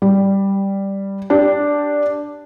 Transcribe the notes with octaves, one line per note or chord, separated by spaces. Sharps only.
G3
D4 G4